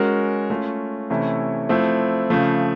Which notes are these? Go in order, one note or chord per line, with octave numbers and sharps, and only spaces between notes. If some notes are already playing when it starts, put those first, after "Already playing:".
Already playing: G#3 C#4 F#4 A#4
A3 C#4 F4
C3 E3 A3 C#4 E4
F3 A3 C4 E4
C#3 F3 A3